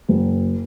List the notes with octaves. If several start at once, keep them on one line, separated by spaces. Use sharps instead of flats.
F#1